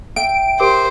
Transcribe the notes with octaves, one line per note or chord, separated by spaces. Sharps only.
E5 G5 D7
G4 A#4 C5 D6